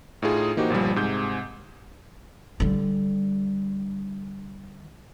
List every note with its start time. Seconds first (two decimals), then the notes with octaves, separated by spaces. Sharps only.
0.22 A2 D#4 F4 G#4
0.57 E3 A#3 D#4 F#4 G4 C5
0.70 G1 A#2 F3 G3
0.96 G#2 C3 G#4 G6
2.60 D3 G3